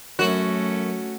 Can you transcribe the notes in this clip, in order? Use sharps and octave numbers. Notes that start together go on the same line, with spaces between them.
F#2 A3 C#4 F#4